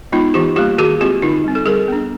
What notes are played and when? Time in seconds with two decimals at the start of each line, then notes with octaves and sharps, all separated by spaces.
0.12 G#3 B3 D#4 F4
0.34 E3 F4 G4
0.56 G3 A#3 F4 G4
0.78 D#3 F#4 G#4
1.01 G#3 C4 F4 G4
1.22 D3 D#4 F4
1.44 G3 C4
1.55 A4
1.66 G3 G#4 A#4
1.88 B3 D4